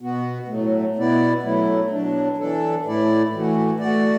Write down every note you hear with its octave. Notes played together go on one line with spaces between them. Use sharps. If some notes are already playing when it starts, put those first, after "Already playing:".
B2 B3 F#4
A2 F#3 A3
B2 B3 E4 D5
F#3 A3 E4
B2 F#3 D4
E3 D4 A4
A2 A3 E4 D5
E3 A3 F#4
A3 F#4 D5